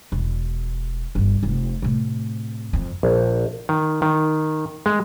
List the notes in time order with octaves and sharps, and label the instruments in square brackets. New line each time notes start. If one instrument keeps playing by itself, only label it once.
[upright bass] E1
G1 G3
F1
A2 C3
F2
[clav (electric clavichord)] A#1
D#3
D#3
G#3